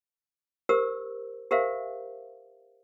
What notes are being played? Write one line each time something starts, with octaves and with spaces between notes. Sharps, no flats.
G4 A#4 C5 E6
G4 A#4 C5 E5 F5